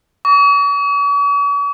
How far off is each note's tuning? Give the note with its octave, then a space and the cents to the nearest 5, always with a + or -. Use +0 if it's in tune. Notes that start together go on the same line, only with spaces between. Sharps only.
C#6 +45